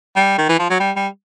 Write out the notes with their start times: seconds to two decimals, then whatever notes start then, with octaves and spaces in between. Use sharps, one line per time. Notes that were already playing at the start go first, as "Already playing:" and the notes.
0.16 G3
0.38 D#3
0.49 E3
0.59 F3
0.70 F#3
0.80 G3
0.96 G3